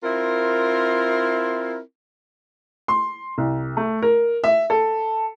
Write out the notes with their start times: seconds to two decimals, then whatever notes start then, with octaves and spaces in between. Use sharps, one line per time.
0.03 C4 E4 F4 A#4
2.88 C6
3.38 C2
3.77 A3
4.02 A#4
4.44 E5
4.70 A4